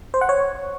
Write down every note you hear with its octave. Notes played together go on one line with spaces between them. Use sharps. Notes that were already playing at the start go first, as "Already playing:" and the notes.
C5
F#5
C#5